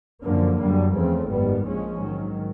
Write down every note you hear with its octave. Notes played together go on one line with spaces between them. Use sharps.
F#2 D3 F3 A#3
F#2 D3 G3
E2 C#3 F3 A3 C4
G#1 F#2 D#3 G3 B3
A#1 A#2 F3 G#3 C#4
G#2 D#3 F#3